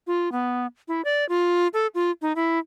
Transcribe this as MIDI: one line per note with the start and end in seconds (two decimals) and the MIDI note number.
0.07 0.31 65
0.32 0.66 59
0.88 1.01 64
1.05 1.27 74
1.29 1.68 65
1.74 1.87 69
1.95 2.11 65
2.22 2.33 63
2.36 2.59 64